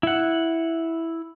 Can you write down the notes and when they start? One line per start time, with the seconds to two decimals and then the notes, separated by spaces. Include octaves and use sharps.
0.03 E4 F#5